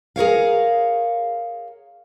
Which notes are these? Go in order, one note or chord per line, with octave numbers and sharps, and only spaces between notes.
G#4 A#4 C#5 F5